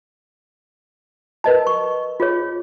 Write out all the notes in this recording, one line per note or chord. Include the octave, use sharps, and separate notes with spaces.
A#4 B4 D#5 A5
C#6
F4 G#4 C#5